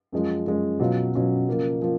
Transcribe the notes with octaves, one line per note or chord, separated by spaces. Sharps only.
F#2 F3 G#3
F#2 F3 G#3
B2 F#3 C#4 F4
B2 F#3 C#4 F4
C#3 F3 A#3
F3 A#3